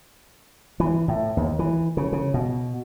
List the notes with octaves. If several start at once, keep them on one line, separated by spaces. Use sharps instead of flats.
E3
A2
D#2
E3
C#3
C#3
B2